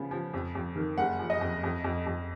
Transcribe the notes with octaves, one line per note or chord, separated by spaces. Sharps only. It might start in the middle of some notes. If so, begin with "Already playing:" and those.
Already playing: C#3 F3 B3
F3
F2
F2
D#3
F#1 F#5
F3
D#5
F2
F2
F2
F2